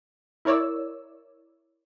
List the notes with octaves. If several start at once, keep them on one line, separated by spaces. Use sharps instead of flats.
E4 A#4 C#5 D5 E6